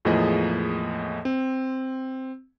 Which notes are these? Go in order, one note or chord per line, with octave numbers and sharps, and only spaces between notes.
E2 A2 F3 A#3 G#4 D#5
C4